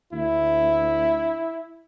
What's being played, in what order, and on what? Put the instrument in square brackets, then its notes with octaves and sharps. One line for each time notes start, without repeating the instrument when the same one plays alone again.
[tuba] D2 [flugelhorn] E4